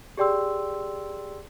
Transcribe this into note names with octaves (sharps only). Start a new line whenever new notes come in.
G4 G#4 D5 G5 C6 E6